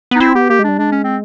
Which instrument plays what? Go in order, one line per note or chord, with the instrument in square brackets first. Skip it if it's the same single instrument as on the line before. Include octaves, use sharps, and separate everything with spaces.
[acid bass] B3
[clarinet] D#4
[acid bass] C4 [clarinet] E4
[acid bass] B3 [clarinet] G4
[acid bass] A#3 [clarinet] G4
[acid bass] G#3
[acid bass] G3 [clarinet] D4
[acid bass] G#3 [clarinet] D4
[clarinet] C#4
C4